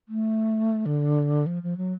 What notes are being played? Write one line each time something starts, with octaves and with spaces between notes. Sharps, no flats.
A3
D3
F3
F3
F#3